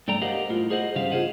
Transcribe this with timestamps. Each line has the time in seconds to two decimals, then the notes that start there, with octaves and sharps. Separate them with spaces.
0.08 G2 A3 D5 G5 A#5
0.22 G4 A#4 C5 D#5 F5 F#5
0.49 A2 F4
0.70 G#4 C5 D#5 F#5
0.95 G2 C#3 G4 C5 F5
1.11 F4 F#4 G#4 C5 D#5 F#5